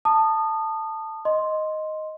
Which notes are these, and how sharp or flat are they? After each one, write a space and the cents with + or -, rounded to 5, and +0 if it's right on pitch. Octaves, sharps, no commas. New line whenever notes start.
A5 +10 D#6 -25
D#5 +0 C6 +0